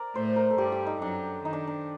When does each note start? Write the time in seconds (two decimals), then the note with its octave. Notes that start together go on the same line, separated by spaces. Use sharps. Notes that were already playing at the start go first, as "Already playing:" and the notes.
Already playing: A#4 D5
0.15 A2 A3 C5
0.36 A#4
0.51 A4
0.58 G2 G3 G4
0.72 G4
0.87 D#4
1.02 F#2 F#3 D4
1.44 D#3 D#4
1.53 D4
1.68 D4